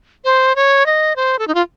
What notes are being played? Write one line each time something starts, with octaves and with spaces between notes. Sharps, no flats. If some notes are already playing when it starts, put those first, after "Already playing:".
C5
C#5
D#5
C5
A4
D#4
F4